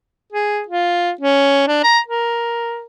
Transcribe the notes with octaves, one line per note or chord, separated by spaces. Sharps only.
G#4
F4
C#4
D4
A#5
A#4